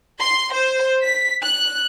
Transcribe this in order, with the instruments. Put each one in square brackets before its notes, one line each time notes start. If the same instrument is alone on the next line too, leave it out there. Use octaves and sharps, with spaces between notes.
[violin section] C6
C5
B6
F#6